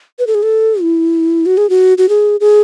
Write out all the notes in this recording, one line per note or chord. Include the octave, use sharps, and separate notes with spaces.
B4
A4
G#4
A4
E4
F#4
G#4
F#4
F#4
G#4
G#4